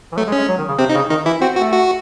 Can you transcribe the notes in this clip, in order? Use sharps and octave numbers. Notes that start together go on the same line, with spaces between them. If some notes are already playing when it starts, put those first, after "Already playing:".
E3
F#3 A3
G#3
C#4
G#3
F#3
D#3
C#3
C3 C4
D#4
C#3
D#3 D#4
E3 E4
C4 F#4
A3 F#4
F#4